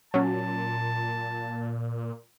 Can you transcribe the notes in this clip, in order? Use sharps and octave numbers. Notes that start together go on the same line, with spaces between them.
A#2 F#3 C#4 A5